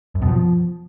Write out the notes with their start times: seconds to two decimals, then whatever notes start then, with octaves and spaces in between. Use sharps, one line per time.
0.15 F#2
0.22 B2
0.28 F3